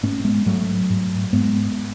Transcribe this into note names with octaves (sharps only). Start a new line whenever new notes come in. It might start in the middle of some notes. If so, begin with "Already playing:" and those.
G#2 A3 C#4
G#3 B3
G#2 F#3 A3
G#2
G#2 G#3 B3